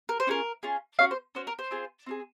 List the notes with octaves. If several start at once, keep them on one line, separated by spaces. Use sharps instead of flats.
A#4
C5
C#4 F4 G#4 A#4
C#4 F4 G#4
C#4 F#4 C#5 F5
C5
C#4 F#4 C5
A#4
C5
C4 F4 G#4
C4 F4 G#4